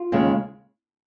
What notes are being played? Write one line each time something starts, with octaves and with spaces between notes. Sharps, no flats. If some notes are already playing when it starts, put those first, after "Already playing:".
Already playing: F4
D#2 C#3 G#3